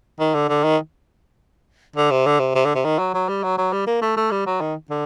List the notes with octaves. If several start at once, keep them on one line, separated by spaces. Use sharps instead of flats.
D#3
D3
D3
D#3
D3
C3
D3
C3
C3
D3
C3
D#3
F#3
F#3
G3
F#3
F#3
G3
A#3
A3
A3
G3
F#3
D#3
D3